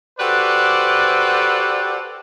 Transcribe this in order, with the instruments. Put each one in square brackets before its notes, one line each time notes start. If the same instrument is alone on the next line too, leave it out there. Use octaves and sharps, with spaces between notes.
[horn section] F#4 G4 A4 B4 C5 D5